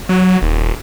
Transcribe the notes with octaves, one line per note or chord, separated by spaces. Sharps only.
F#3
D#1